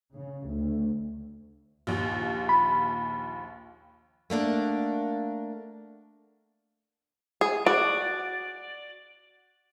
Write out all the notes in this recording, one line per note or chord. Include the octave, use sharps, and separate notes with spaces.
C#3
D2
A#1 D#2
B5
A3 A#3 D4 F#5
G#4
F#4 D5